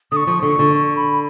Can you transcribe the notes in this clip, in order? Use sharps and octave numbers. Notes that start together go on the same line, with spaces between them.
D3 C#6 D#6
F3
D3 C#6
D3
C#6
B5